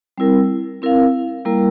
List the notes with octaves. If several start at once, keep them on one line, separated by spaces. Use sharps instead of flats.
G3 C4 E4 A#4
C4 E4 A#4 F5
G3 A#3 E4 A#4